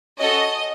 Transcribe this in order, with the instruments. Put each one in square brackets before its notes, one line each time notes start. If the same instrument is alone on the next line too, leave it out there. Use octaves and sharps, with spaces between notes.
[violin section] C#4 F#4 A4 D#5